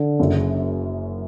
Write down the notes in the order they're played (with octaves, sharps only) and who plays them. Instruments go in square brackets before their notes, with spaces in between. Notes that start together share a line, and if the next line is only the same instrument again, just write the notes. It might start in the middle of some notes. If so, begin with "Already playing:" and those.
Already playing: [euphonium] D3
[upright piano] F#1 F#2 C#3